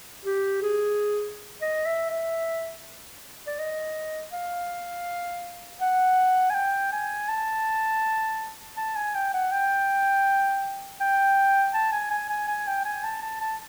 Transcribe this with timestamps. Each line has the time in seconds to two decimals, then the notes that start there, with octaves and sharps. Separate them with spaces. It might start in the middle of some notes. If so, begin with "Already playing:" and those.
0.25 G4
0.62 G#4
1.61 D#5
1.86 E5
2.10 E5
3.47 D5
3.59 D#5
4.32 F5
5.81 F#5
6.50 G#5
6.54 G5
6.92 G#5
7.29 A5
8.77 A5
8.96 G#5
9.15 G5
9.34 F#5
9.52 G5
11.00 G5
11.74 A5
11.92 G#5
12.10 G#5
12.29 G#5
12.47 G#5
12.67 G5
12.85 G#5
13.04 A5
13.22 A5
13.40 A5